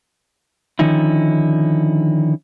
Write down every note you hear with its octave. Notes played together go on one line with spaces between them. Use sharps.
D3 D#3 F3 C#4 D#4 E4